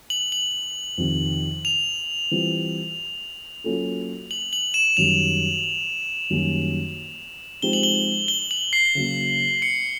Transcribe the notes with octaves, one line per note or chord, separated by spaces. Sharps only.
F#7
F#7
F2 C3 D#3
F7
E3 G3 C4 F4
F#3 A#3 C#4 F4 A4
F#7
F#7
E7
F#2 D#3 G3 F7
F#2 D#3 G3 A#3 C#4
F3 G#3 C4 D#4 G4 G7
F#7
G7
G7
F#7
C7
C#3 F#3 A#3
C#7